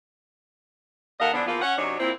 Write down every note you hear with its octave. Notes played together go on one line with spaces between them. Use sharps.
D#2 A4 A#4 D#5 F5 F#5
D3 E3 F3 B3 D4
E2 F3 A#3 B3 F4
C#4 F#5
F#2 C3 F#3 D4 D#4 C#5
A#2 C4 E4